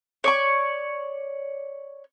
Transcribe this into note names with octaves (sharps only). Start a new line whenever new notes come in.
C#5 D5 C#6